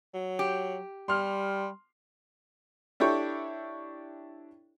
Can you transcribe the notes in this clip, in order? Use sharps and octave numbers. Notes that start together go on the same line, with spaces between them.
F#3
G4
G3 C6 F6
D4 E4 G4 A4 C#5 G5